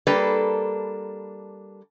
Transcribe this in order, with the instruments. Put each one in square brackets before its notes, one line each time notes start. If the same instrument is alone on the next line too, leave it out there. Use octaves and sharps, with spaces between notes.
[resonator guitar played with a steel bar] G3 A#3 D4 A4 B4